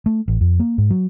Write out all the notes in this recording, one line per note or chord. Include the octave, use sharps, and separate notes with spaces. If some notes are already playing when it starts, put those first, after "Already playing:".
A3
A1
F2
A#3
G#2
F#3